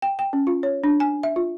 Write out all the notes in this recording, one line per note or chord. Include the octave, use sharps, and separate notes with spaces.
G5
G5
C#4
F4
C#5
D4
G#5
E5
F4